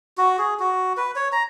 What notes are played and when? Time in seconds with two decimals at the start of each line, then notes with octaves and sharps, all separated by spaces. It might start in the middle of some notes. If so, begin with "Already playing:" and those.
0.18 F#4
0.38 G#4
0.60 F#4
0.97 B4
1.16 C#5
1.32 A#5